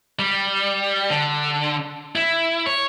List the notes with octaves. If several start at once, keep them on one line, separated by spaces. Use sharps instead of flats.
G3
D3
E4
C#5